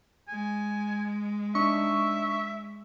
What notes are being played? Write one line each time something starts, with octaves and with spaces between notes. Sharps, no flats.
G#3 G#5
D4 D#4 E5 C#6